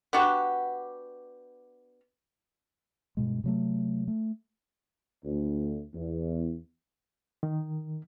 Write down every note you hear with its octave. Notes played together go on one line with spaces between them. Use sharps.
B3 D4 F#4 G4
G2 B2 G#3
C3 F#3 A3
A3
D2
E2
D#3